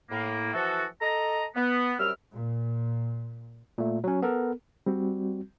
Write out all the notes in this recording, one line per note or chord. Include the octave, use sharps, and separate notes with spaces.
A2 A#3
E3 F3 F#4 A4
A4 D#5 A#5
B3
F#2 C3 G3 G4 E6 F6
A#2
A#2 A3
F#3 C#4
B3 A4 A#4
G3 C4 F#4